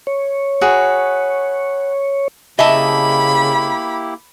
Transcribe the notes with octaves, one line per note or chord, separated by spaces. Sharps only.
C#5
F#4 G#4 B4
C#3 A#3 E4 G4 D#5 E5 A5 B5